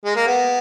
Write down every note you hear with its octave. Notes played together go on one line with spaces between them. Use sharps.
G#3
A#3
B3